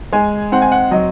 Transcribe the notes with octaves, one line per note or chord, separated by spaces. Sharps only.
G#3 G#5
C4 F#5
G#5
F#5
F#3 D#5